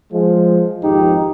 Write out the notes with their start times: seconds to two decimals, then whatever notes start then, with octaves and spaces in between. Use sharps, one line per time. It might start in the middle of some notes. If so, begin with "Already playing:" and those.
0.12 F3 G#3
0.83 G#1 F2 D#4 G4